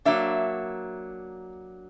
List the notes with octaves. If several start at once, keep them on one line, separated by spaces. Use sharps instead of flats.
F#3 A#3 D4 E5